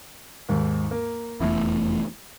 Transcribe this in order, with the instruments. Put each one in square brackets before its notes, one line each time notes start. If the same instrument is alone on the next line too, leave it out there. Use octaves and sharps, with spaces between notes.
[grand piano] D#2 G#2
A#3
[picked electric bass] F1 E2 A3 [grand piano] E4